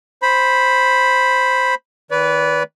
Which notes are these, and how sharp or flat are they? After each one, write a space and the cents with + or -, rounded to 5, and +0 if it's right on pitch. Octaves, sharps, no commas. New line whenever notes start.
C5 +0 B5 +0
D#3 +15 B4 +0 D5 -35